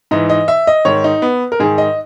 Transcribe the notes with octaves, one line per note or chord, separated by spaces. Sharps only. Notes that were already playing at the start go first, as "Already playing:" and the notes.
G#2 E3 D#5
D#5
E5
D#5
G#2 D#3 C#5
D#4
B3
A#4
G#2 D#3 G#4
D#5